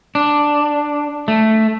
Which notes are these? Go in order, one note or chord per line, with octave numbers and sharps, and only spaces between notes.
D4
A3